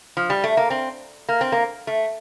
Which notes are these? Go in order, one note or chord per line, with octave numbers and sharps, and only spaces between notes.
F3
G3
A3
A#3
C4
A#3
C4
A#3
A3